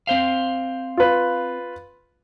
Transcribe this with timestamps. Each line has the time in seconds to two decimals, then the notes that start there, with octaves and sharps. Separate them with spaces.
0.07 C4 C5 F5
0.97 F4 B4